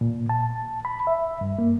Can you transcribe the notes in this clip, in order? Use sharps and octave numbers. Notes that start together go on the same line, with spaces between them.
A#2
A5
B5
E5
G2
A#3